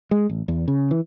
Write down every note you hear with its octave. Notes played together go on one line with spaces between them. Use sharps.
G#3
A1
E2
C#3
E3